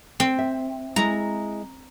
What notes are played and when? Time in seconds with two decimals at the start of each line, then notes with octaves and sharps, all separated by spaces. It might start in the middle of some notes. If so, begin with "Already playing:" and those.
0.20 C4
0.39 E5
0.96 G#3 E4 A#5